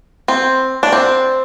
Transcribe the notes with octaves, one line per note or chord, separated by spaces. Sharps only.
C4
D4
C4